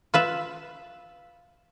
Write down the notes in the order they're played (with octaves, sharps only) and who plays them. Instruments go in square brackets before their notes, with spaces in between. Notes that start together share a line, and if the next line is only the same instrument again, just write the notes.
[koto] F4 B4 E5